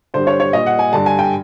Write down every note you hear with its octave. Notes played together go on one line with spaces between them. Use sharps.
G2 D3 G3 C5
C#5
C#5
A#2 G3 D#5
F#5
G#5
G2 D3 G3 A5
G#5
G5